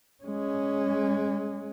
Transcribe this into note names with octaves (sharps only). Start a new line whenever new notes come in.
G#3 C#4